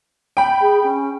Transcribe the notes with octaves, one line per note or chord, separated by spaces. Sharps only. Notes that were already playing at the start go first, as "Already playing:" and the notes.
G5 B5
G#4
C#4